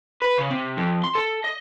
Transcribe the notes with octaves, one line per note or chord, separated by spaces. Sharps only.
B4
C#3
C3
F2
C6
A4
D#5